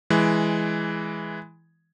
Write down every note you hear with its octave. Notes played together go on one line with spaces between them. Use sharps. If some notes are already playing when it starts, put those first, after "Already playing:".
E3 G#3